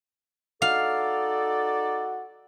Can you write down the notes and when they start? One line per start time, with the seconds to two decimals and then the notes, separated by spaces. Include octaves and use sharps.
0.62 D#4 F#4 A4 D5 F5